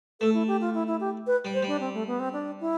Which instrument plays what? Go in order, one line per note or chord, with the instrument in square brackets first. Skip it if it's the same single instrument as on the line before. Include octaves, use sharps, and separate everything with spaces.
[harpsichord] A3 [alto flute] A4
[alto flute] E4
G4
F4
E4
E4
G4
B4
[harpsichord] G3
[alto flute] C5
[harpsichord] G3
[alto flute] D4
C4
A3
B3
C4
D4
E4